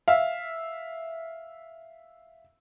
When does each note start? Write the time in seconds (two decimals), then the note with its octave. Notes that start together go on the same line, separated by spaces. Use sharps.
0.08 E5 F5